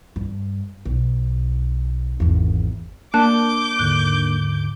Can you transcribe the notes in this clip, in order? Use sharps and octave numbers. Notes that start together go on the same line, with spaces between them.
G2
B1
G#1 E2
A#3 D4 A5 D6 F#6 G6
D#2 G#2 D3 F#6